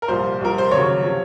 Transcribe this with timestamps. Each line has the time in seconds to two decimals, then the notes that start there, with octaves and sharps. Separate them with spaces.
0.02 A#4
0.08 C2 A#2 F3 C5
0.41 C2 C3 F3 A#4
0.58 C5
0.71 D#2 C#3 F#3 C#5
1.03 C3 F3